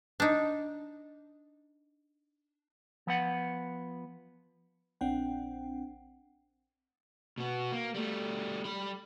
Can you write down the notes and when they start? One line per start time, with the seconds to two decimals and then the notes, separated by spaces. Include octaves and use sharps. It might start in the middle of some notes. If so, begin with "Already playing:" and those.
0.20 D4 D#4
3.07 F3 B3 F#5
5.01 A#1 C4 D4 F#5 G5
7.38 B2 B3
7.72 A#3
7.95 G3 A3
8.65 G3 B5